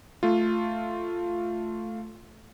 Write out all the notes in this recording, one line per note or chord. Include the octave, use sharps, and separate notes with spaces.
A3 F4